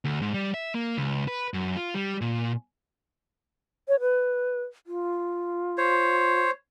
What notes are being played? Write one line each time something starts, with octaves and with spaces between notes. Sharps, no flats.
D2
G#2
G3
E5
A#3
C#2
B4
F#2
F4
G3
A#2
C#5
B4
F4
C5 C#5